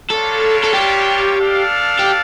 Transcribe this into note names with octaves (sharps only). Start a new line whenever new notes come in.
G3 A#3 D4 F4 A4 C#5
A4
G4
D4 A4 D5 F5
G4